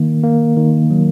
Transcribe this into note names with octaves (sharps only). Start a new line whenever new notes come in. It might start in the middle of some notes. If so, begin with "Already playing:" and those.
Already playing: D#3 A#3
A#3
D#3
F#3